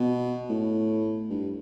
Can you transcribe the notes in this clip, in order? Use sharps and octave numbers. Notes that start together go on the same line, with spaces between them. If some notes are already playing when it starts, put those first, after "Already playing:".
Already playing: B2
A2
G2